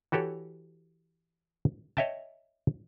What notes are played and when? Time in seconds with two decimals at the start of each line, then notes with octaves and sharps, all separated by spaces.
0.12 E3 F#4 G4 A4 C#5
1.97 C#5 D#5 E5 G5 A5